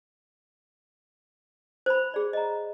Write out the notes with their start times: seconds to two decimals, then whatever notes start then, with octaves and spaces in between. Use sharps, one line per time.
1.86 C5 B5
2.14 G#4 D5
2.33 D#5 A#5